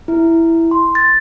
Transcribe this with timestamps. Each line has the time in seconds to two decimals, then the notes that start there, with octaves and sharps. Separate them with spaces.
0.08 E4
0.71 C6
0.95 A6